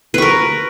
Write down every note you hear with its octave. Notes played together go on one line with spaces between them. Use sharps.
A#4 B4 C#6